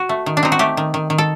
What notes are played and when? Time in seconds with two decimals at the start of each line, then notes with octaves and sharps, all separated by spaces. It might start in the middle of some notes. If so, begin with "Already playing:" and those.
Already playing: F#4
0.09 A3
0.26 D#3
0.37 D4
0.43 C4 D#4
0.52 F#4
0.59 A3 G4
0.77 D#3
0.94 D#3
1.10 D#3
1.18 A4